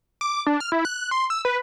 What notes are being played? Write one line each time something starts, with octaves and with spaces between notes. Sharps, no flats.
D6
D4
F6
E4
F#6
C6
E6
B4